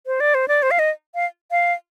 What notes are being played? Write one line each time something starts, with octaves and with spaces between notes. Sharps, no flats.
C5
D5
C5
D5
C5
F5
D#5
F5
F5